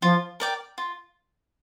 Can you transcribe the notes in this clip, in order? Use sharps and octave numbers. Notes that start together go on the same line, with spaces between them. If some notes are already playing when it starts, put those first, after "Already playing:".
F3 F4
A#4 D5 G5
F4